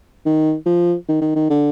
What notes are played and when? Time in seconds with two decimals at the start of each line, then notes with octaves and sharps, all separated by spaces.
0.26 D#3
0.66 F3
1.08 D#3
1.21 D#3
1.35 D#3
1.50 D3